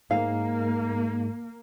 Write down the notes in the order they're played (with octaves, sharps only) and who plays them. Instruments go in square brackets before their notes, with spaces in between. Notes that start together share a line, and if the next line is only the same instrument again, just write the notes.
[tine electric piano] G#2 G#3 [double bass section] A#3 [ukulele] F5